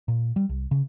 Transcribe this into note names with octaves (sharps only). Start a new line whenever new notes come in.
A#2
G3
C2
C#3